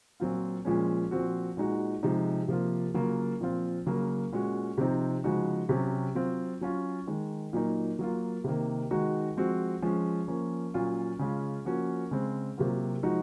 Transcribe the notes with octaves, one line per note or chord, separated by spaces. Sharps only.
A#2 F#3 C4 F4
A#2 F3 G#3 C#4
A#2 F3 C4 F#4
A#2 G#3 D#4 F#4
C3 F3 G#3 D#4
C3 F3 A#3 F4
C#3 F#3 A#3 F4
A#2 F3 C4 F4
C#3 F#3 A#3
A#2 G#3 C#4 F#4
C3 F3 C4 D#4
C#3 F3 G#3 D#4 F#4
C3 F#3 C#4
F#3 C4 F4
F#3 C#4 F4
D#3 G#3 D#4
A#2 F#3 A#3 D#4
F#3 A#3 F4
C3 D#3 A#3
D#3 G#3 D#4 F#4
F3 G#3 C4 F#4
F3 G#3 C#4
F3 A#3 C#4
A#2 F#3 C#4 F4
C#3 G#3 C#4 F4
F3 A#3 C#4 F#4
C#3 G#3 C4
C3 F#3 A#3 F4
F3 G#3 D#4 F#4